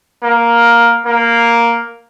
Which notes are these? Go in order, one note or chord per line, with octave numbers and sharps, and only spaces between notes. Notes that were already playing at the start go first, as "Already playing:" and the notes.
A#3
A#3